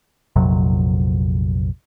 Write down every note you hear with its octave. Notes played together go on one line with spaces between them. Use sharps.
A#1 F2 C3 F#3